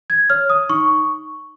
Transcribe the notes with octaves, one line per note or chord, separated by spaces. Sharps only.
G#6
C#5 F6
D#6
D#4 C#6